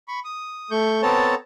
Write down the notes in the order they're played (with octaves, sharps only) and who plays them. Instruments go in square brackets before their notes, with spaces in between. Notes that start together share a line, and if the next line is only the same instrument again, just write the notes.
[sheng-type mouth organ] B5 C#6
D#6
A3 C#6 G6
B3 C4 A4 C#5 A5 A#5